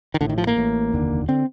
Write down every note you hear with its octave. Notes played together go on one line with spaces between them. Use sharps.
D#3
A1 A2 D3
D#3
F3
A#3
A1 A2
F1 D#2 D3
D3 C4